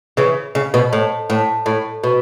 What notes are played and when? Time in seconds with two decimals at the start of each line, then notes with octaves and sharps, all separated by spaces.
0.17 C#3 E3
0.55 C#3
0.74 B2
0.93 A2
1.30 A2
1.66 A2
2.04 B2